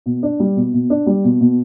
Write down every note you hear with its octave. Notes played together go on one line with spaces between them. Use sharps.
B2
D4
G3
B2
B2
D4
G3
B2
B2